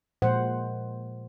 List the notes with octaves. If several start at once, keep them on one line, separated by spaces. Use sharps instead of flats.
A#2 F3 G#3 C5 F#5